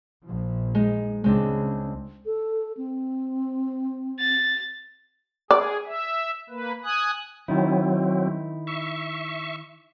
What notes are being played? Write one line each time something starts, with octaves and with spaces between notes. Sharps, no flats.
A#1 F3
G#3 D#4
C#2 C#3 G#3 C4 D4
A4
C4
A6
G#4 D5
E5
A#3 B4
G#5 D#6 F#6
D#3 F#3 C4 D#4 E4
E5 C#6